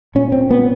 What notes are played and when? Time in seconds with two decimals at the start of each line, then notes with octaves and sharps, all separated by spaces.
0.15 A#2 C#4
0.32 A#2 C4
0.50 A#2 B3